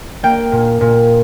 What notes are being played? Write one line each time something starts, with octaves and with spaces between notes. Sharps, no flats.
A#3 G5
A#2
A#2